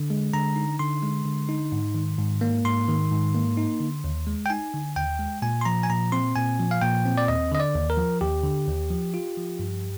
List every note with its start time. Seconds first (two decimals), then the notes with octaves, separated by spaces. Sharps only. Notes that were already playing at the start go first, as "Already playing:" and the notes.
Already playing: D3
0.10 G#3
0.33 D3 A#5
0.56 D#4
0.79 D3 C6
1.03 G#3
1.25 D3
1.49 D#4
1.72 G#2
1.95 D#3
2.18 G#2
2.41 A#3
2.64 G#2 C6
2.88 D#3
3.12 G#2
3.35 A#3
3.57 D#4
3.80 D3
4.04 D#2
4.27 G#3
4.46 G5
4.50 D#4 G#5
4.74 D3
4.96 D#2 G5
5.19 G#3
5.42 A#2 G#5
5.61 C6
5.65 F3 A#5
5.83 G#5
5.89 A#2 A#5
6.12 C4 C6
6.36 A#2 G#5
6.59 F3
6.71 F5
6.81 A#2 G5
7.05 C4
7.18 D5
7.28 D#2 D#5
7.52 D3 D#5
7.60 D5
7.75 D#2
7.90 A#4
7.97 F3
8.21 D#2 G4
8.44 D3
8.68 D#2
8.90 F3
9.14 F4
9.37 F3
9.59 G2